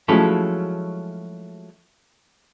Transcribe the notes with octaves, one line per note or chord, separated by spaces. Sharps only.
F3 F#3 G#3 A3 C#4 E4